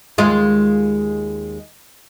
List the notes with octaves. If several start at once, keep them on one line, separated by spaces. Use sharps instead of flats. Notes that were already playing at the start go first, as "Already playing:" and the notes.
D#2 G#3 F4